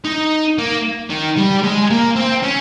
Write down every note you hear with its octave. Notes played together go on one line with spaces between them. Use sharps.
D#4
A#3
D#3
G3
G#3
A#3
C4
C#4